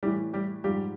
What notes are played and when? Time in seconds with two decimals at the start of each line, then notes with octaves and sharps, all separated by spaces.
0.03 A2 E3 G3 G4
0.33 G3 G4
0.64 G#2 F3 G3 G4